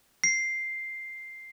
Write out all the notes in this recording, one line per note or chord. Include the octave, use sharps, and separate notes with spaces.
C7